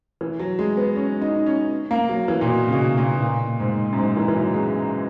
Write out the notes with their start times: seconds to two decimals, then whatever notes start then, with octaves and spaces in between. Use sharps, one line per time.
0.21 E3
0.39 F#3
0.59 G#3
0.77 B3
0.96 C#4
1.21 D#4
1.46 C#4
1.91 A#3
2.09 F#3
2.28 E3
2.41 A#2
2.47 B2
2.68 C#3
2.73 B2
2.97 A#2
3.22 A#2
3.60 G#2
3.93 F#2
3.98 G#2
4.17 E3
4.28 E3
4.35 F#3
4.54 G#3